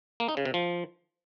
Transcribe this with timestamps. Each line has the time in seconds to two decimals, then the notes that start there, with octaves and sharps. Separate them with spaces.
0.20 A#3
0.28 D#4
0.37 C#3
0.45 C3
0.54 F3